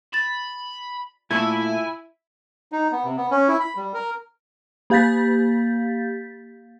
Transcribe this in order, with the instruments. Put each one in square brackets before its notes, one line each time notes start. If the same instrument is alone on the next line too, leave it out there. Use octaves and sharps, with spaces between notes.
[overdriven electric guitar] B5 [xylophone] A6 E7
[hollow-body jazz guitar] A#2 A3 A4 [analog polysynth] E4 [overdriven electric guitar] G#5
[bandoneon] D#4
B3
C3
B3
C#4
E4
B5
G3
A#4
[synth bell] A#3 G4 F5 G6 A6 B6